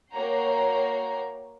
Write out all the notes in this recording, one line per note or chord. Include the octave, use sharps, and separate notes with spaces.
A#3 F#4 C#5 G5 A#5 C7